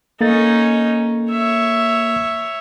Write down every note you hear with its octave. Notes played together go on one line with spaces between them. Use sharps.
A#3 C#4 D#4 A4 A6
C#5 E5